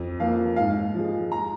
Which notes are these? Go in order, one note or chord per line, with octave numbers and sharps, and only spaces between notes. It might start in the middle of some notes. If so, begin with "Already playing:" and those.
Already playing: F2
F3 A#3 F5
G#2 F5
F3 G#3
A#5